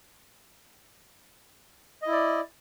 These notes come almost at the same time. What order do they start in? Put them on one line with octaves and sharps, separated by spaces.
D#5 E4 D5